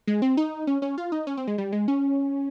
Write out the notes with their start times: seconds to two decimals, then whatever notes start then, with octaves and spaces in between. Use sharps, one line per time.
0.07 G#3
0.22 C4
0.37 D#4
0.67 C#4
0.82 C#4
0.98 F4
1.12 D#4
1.27 C#4
1.37 C4
1.47 G#3
1.58 G3
1.73 G#3
1.88 C#4